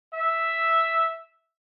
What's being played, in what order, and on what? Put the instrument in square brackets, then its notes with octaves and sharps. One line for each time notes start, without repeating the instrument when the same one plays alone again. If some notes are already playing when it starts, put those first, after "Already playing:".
[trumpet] E5